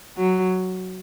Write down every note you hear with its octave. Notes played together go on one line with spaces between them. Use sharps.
F#3